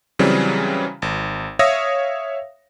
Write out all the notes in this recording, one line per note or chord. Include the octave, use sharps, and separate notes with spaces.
C#3 E3 F#3 G3 C4
G#1
C#5 E5 F5 D#6 E6 A#6